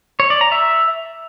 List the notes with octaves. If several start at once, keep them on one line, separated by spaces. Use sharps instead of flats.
C#5
D5
A#5
E5